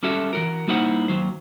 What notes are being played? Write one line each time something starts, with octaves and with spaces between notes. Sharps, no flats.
G3 C#4 F#4 A4 E5
E3 F#4 A#4
G3 A#3 D#4 E4 C5 F#5
D#2 F#3 C5